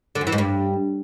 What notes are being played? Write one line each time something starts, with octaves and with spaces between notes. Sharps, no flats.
D3
F#2
E3
G#2
G2